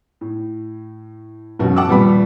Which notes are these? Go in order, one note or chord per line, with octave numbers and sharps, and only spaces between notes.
A2
E1 F#2 B2 F#4
F#5 A5 D6 E6
D#1 F3 G3 B3 G4 B5